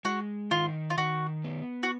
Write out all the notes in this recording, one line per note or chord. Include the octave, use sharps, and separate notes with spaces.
G#3 F#4
D#3 F4
F4
D#3 F#4
B3
F#4